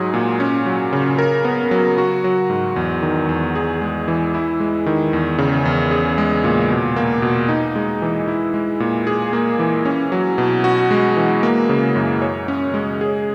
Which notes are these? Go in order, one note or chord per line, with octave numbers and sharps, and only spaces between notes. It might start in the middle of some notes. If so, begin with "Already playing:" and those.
Already playing: G#2 F#3 G#4
A#2
C#4
F#3
C#3
A#4
B3
F#3
F#4
F#3
G#2
E2
D#3
E2
G#4
G#3
E3
E4
G#3
D#3
E2
C#3
E2
G#4
G#3
A#2
B2
A#3
B2
D#4
G#3
E3
E4
G#3
A#2
G#4
A#3
E3
C#4
F#3
B2
F#4
G#3
E3
A#3
C#3
F#2
C#5
C#4
G#3
G#4